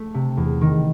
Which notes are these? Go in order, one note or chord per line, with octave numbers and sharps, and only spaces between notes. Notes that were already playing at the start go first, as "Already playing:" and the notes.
Already playing: A3
C3
E2
D#3